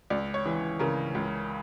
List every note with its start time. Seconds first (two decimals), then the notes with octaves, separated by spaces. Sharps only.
0.10 C#2 D5
0.34 C#5
0.46 E3
0.79 C#3 A#4
1.15 C#2